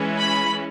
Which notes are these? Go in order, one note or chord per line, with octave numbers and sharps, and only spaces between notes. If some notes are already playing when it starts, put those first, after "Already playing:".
Already playing: E3 G#3 C#4
B5